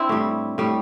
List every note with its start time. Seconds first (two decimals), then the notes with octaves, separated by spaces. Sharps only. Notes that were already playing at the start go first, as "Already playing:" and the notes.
Already playing: C4 D4 E4
0.09 A2 G3
0.58 A2 G3